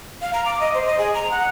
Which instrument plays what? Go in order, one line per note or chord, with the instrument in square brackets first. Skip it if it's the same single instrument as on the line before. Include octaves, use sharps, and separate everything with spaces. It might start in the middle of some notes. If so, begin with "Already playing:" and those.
[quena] F5
A#5
D6
D#5
C5
D#5
G#4
A#5
F#5